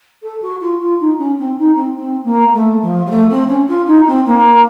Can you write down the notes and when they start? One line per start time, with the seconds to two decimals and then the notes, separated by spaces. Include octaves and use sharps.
0.22 A4
0.42 F#4
0.61 F4
0.80 F4
1.00 D#4
1.18 C#4
1.38 C4
1.57 D#4
1.75 C4
1.96 C4
2.24 A#3
2.53 A3
2.82 F3
3.06 F#3
3.10 A3
3.30 C4
3.48 C#4
3.68 F4
3.86 D#4
4.07 C4
4.26 A#3